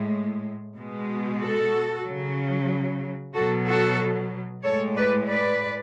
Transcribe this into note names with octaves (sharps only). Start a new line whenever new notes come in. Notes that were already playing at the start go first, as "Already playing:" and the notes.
Already playing: A2 G#3
B2 G#3
F#4 A4
C#3 F#3
B2 F#3 F#4 A4
F#4 A4
A2 G#3 A4 C#5
B4 D5
B4 D5